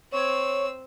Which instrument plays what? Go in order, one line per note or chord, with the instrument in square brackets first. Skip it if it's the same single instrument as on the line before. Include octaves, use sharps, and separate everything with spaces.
[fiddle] C4 E6 [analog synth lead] C#5